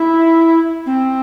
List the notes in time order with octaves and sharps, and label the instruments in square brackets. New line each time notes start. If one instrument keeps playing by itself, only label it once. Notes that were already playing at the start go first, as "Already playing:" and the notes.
Already playing: [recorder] E4
C4